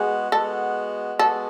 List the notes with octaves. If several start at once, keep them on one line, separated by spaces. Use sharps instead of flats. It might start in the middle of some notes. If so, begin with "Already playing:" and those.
Already playing: G#3 B3 F#4 G#4
G#3 B3 F#4 A4
G#3 B3 F#4 A4